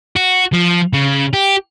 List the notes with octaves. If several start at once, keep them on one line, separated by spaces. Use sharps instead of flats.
F#4
F3
C#3
G4